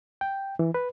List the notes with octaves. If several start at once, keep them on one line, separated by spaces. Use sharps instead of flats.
G5
E3
B4